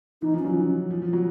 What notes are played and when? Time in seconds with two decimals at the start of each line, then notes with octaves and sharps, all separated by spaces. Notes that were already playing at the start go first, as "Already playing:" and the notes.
0.22 E3 D#4
0.34 F3
0.39 C#4
0.44 F#3
0.90 F3
1.02 F3
1.13 F#3